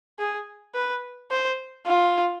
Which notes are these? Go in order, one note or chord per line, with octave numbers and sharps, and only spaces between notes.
G#4
B4
C5
F4